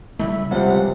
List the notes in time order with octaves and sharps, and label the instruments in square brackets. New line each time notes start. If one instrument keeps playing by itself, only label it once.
[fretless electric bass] C#3 G3 A3 [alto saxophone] E4
[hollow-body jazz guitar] C#2 G2 F3 [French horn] C3 [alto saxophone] F#5